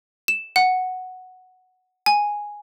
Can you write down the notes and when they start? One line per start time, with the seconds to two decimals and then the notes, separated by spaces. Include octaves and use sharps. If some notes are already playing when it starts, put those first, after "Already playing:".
0.28 E7
0.56 F#5
2.06 G#5